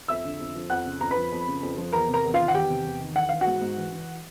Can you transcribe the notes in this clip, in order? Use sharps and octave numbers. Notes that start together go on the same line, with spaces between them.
F2 E5 E6
D3
F2
F3
F2 F#5 F#6
C#3
F2 A#5
B4 B5
F3
F2
C#3
F2
F3
E2 A#4 A#5
C3
A#4 A#5
E2
D#3 F4 F5
F#5
E2 G4 G5
C3
E2
D#3
E3 F#5
E3 F5
F#4 F#5
G#2
G#2
E3
E3